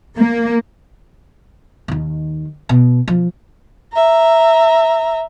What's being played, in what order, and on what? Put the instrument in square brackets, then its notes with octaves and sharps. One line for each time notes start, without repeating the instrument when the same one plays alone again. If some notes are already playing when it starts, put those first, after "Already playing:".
[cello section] A#3
[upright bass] D#2 D#3
B2
F3
[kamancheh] E5 A#5